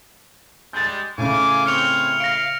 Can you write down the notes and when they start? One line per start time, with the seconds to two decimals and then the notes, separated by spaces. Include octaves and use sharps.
0.73 G3 G#3 G6 A6
1.18 A2 C#3 F5 G#5 D6
1.66 C4 C#5 F6 C#7 F7
2.20 F5 A#6 D7